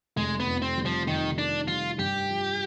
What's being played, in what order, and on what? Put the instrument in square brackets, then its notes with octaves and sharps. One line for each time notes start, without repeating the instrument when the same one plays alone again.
[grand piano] F1 [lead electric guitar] G#3
[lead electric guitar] B3
[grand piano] F2
[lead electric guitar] C4
[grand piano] G3
[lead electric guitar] F3
[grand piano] F2 [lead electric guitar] D#3
[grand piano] D#3 [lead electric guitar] D4
[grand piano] G3 [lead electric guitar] F4
[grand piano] G2 [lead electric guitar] G4
[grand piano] F3